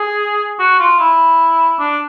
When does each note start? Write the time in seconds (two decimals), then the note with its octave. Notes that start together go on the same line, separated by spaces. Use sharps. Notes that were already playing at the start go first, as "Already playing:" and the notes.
Already playing: G#4
0.59 F#4
0.80 F4
1.00 E4
1.79 D4